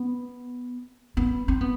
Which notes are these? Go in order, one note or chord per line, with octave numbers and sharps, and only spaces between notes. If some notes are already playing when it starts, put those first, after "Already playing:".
Already playing: B3
B3
C4
B3